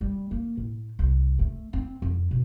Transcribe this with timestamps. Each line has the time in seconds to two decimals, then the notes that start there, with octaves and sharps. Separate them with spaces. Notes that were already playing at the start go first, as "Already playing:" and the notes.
0.01 G3
0.31 A#3
0.57 A2
0.99 C2
1.39 A3
1.73 C4
2.02 F2
2.31 B2